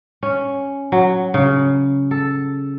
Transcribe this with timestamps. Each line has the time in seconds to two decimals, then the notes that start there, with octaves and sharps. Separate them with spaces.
0.23 C#4
0.92 F#3
1.34 C#3
2.11 A4